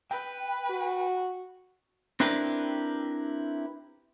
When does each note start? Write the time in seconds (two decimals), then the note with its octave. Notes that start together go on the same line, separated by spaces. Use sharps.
0.11 B4 G5
0.70 F#4
2.20 C4 D4 E4 G4 A#4 B4